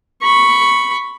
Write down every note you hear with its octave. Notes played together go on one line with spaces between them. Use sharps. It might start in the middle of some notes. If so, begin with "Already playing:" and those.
B5 C#6